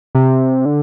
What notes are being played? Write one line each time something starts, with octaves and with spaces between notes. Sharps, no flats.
C3
D3